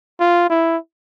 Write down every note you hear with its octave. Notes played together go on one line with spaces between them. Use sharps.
F4
E4